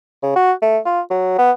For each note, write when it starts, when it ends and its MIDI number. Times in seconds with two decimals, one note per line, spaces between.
0.23 0.35 49
0.36 0.52 66
0.62 0.78 57
0.85 1.01 65
1.10 1.34 54
1.38 1.51 59